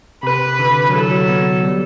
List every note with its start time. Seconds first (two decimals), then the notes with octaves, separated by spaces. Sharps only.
0.23 C3 B4
0.59 D3
0.89 F#3
0.94 E3 A4
1.11 F#3
1.29 B3
1.65 G3